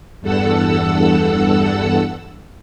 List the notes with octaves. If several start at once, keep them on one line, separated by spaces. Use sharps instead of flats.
E2 G2 A4 F#5 E6